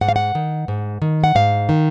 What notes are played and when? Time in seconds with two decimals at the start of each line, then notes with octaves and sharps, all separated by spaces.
0.01 G#2 F#5
0.09 F5
0.16 F#5
0.35 D#3
0.68 G#2
1.02 D#3
1.24 F#5
1.35 G#2 F5
1.69 D#3